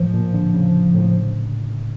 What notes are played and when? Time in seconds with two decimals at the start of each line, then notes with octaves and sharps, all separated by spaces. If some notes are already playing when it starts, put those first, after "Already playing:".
Already playing: A2 F3
0.14 A#2
0.34 D3
0.54 C#3
0.95 A2